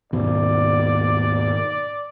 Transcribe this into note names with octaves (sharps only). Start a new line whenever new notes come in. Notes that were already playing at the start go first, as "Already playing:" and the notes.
D#2 G#2 B2 D#3 D5